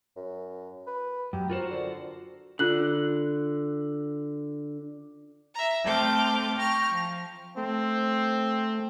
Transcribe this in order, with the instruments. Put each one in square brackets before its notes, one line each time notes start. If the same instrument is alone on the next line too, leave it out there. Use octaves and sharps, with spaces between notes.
[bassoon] F#2
B4
[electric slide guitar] F#2 [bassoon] G4
[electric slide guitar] F4 F#4 C5 [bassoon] A#4
[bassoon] D3
[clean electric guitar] D3 [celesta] F4 F#6 F#7
[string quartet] E5 A#5
A3 C4 D6 F6 G6
G5 A#5 C#6 F6
F3
[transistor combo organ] A3 [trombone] C4